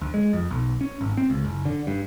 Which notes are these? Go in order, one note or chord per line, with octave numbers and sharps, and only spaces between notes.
D2
G#3
F2
B1
C#4
G#1
C4
C#2
F#1
D3
G2